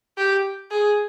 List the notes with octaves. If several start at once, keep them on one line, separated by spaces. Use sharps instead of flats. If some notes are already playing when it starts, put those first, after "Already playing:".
G4
G#4